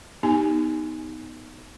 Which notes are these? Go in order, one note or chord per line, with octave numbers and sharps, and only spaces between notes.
B3 D#4 G4 G#5